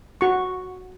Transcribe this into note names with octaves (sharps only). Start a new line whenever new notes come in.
F#4 C#6